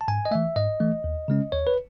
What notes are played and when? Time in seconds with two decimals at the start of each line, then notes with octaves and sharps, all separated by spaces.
0.01 A5
0.08 G#2 G#5
0.25 D#5
0.31 E3 A3 E5
0.56 G#2 D#5
0.80 E3 A3
1.04 D#2
1.28 C#3 G#3 C#4
1.52 D#2 C#5
1.67 B4